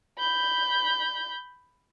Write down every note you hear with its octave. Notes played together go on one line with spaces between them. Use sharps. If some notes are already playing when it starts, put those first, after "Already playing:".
B5 G6